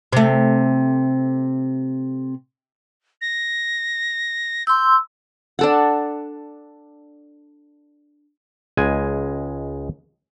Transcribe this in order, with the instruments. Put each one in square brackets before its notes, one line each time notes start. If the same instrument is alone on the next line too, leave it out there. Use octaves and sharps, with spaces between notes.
[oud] C3 A3
[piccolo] A#6
[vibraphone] C6 E6 [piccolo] G6
[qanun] D4 A4 F#5
[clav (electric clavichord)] C#2 G#3 G#5